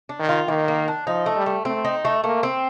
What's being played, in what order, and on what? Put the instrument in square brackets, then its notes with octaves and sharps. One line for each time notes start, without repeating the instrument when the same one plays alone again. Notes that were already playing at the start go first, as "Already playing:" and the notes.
[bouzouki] D4
[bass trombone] D#3
[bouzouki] F4
[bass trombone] D#3 [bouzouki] A#3
[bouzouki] A#3
D4
[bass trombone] F3 [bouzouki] D#4
[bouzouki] A3
[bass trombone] G3
[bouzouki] A3
[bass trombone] A3 [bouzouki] C4
[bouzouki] D#4
A3
[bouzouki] A3 [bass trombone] A#3
[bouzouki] C4